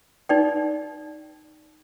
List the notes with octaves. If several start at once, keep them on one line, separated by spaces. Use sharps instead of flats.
D#4 D5 G5